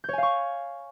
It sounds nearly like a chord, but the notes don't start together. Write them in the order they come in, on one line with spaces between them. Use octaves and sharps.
G6 C#5 G#5 F5 C#6